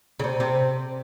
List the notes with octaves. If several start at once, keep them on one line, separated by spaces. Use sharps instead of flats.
C#3
C3
C3